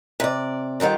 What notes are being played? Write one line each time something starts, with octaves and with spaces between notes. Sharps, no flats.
C3 D5
D3 D#3 G3 F4